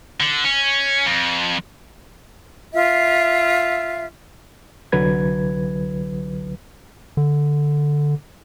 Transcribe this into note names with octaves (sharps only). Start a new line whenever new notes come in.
D3
C#4
F2
F4 E5
C2 D3 F#3 B4 G#6
D3